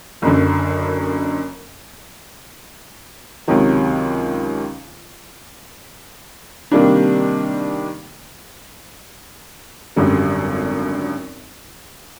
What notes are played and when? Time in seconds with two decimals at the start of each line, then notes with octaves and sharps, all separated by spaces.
0.22 F#1 F#2 D3
3.47 C#2 C3 D#3 F#3
6.71 C3 D#3 G3 A#3 D4
9.96 G#1 F#2 D3 G3